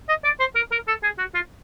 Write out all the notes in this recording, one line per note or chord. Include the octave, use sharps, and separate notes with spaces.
D#5
D5
C5
A#4
A#4
A4
G#4
F#4
F4